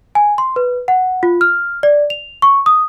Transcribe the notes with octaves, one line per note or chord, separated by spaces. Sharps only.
G#5
C6
B4
F#5
F4
F6
D5
F7
C#6
D#6